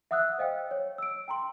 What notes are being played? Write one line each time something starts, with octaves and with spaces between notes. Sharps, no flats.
E5 F#5 D#6 E6 F#6
C5 D#5 F5 G5
C#5
E6 D7
G5 A#5 C6